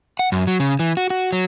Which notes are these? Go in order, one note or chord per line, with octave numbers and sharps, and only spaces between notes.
F#5
F#2
F#3
C#3
E3
F#4
F#4
F#3